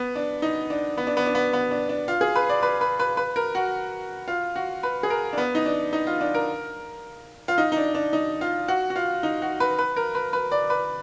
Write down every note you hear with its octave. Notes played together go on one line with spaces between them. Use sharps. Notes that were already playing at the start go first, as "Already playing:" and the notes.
Already playing: B3
D4
D#4
D4
B3
D4
B3
D4
B3
B3
D4
D4
F4
G#4
B4
D5
B4
B4
B4
B4
A#4
F#4
F4
F#4
B4
G#4
A#4
D4
B3
D#4
D4
D#4
F4
D4
A#4
F4
D#4
D#4
D4
D4
D#4
F4
F#4
F#4
F4
D#4
F#4
B4
B4
A#4
B4
B4
D5
B4